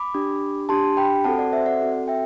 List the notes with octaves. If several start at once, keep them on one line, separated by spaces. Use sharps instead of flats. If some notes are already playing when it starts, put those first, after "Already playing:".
Already playing: B5 D6
D4 G4
D4 G4 A5 C6
G5 B5
C4 F#4 A4 F#5 A5
D5 F#5
C5 E5
D5 F#5
C4 F#4 A4
E5 G5